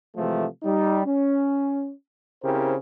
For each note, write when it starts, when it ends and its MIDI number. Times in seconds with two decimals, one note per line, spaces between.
0.17 0.46 48
0.17 0.46 52
0.17 0.46 53
0.17 0.46 56
0.17 0.46 57
0.63 1.01 55
0.63 1.01 63
1.06 1.91 61
2.44 2.75 49
2.44 2.75 60
2.44 2.75 64
2.44 2.75 67
2.44 2.75 70
2.44 2.75 72